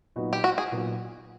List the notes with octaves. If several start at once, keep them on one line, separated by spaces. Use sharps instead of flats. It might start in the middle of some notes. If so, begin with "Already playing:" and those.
A#2 F#3 B3 D#4 F#4
G4
F#4
G#4
A#2 F#3 B3 D#4 F#4